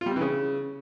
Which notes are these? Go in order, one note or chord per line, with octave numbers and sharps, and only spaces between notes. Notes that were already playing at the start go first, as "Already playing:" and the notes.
F4
G3
C4
E3
C#3